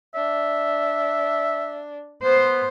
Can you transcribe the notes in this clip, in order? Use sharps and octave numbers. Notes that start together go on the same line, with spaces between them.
D4 E5
B3 C5